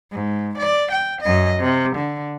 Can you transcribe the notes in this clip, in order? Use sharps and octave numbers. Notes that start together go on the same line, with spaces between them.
G#2
D5
G5
F#2 D#5
C3
D3